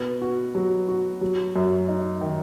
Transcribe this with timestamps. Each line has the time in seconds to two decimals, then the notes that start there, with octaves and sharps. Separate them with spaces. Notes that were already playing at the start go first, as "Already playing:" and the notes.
Already playing: B2 B3
0.22 F#4
0.55 F#3
0.88 F#4
1.21 F#3
1.56 F#2
1.88 D#4
2.21 D#3